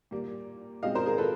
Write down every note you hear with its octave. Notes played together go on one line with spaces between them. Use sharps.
A#2 G3 A#3
B2 G#3 C4 D#5 F5
A#4 C5
G#4 A#4
A4 B4